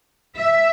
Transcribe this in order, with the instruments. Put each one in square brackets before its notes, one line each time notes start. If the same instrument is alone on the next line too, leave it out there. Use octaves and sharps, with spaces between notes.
[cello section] E5